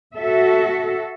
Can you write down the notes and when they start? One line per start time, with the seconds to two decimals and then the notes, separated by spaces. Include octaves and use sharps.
0.16 F#4 A4 E5